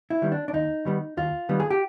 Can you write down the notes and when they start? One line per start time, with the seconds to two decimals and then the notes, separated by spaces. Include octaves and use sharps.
0.10 E4
0.22 D#3 G3 B3
0.32 D4
0.48 D4
0.53 D#2 D#4
0.85 D#3 G3 B3
1.17 D#2 F4
1.49 D#3 G3 B3
1.60 G#4
1.71 G4